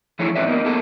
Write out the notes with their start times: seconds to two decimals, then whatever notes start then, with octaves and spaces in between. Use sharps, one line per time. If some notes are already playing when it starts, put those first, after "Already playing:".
0.19 E3 F3 A3 E4 G#4 C#5
0.36 G#2 C4 D4 B4 D5 E5
0.47 A#3 B3 D#4
0.65 A#3 B3 G#4 A4